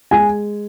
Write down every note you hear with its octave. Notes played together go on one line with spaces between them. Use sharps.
G#3 G#5